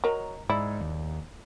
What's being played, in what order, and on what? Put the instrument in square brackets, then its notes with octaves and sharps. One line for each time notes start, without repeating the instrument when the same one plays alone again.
[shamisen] F#3 [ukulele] A#4 D#5 A#5
[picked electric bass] G#2 [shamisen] E4 [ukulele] D5
[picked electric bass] D#2